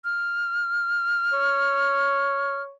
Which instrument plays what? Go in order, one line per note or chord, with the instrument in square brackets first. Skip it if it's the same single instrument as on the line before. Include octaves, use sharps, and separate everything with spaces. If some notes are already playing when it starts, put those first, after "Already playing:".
[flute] F6
[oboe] C#5